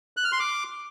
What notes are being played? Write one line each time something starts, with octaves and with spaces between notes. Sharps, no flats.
F#6
F6
C6
D6